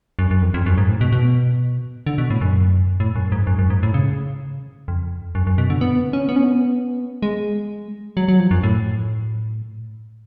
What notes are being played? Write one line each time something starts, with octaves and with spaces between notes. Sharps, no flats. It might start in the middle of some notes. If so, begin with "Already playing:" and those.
F#2
F#2
F2
F2
F#2
G#2
A2
B2
B2
D3
B2
A2
F#2
A2
F#2
G#2
F#2
F#2
G#2
A2
C#3
F2
F#2
F#2
B2
D3
B3
C#4
B3
C#4
B3
G#3
F#3
F#3
F3
F#2
A2